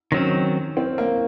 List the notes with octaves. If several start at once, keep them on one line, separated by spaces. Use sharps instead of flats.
D#3 F#3 C4 C#4
C4
A#3